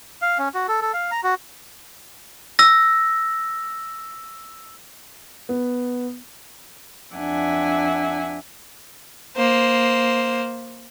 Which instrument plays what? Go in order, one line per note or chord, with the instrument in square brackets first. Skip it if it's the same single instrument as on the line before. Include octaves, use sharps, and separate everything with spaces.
[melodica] F5
C#4
F#4
A4
A4
F5
A#5
F#4
[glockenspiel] E6 A#6
[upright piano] B3
[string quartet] F2 D4 E5 F#5 G#5
[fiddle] A#3 C5